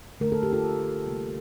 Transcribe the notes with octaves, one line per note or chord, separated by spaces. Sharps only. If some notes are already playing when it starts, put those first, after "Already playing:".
D3 A3 A#4
A4
G4
F4 A4
C3 G3 A#3